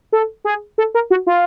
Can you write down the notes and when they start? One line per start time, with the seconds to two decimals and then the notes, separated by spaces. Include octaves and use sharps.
0.13 A4
0.45 G#4
0.78 A4
0.95 A#4
1.10 F#4
1.27 F4